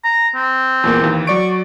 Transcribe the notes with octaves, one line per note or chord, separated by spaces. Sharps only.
A#5
C4
E2 A#2 A#3
D#2 E3
F#3 D5 C#6 D7